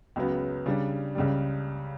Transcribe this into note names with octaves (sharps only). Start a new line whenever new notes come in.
C#2 C#3 F#3 B3
C#3 G3 D4
C#2 C#3 G3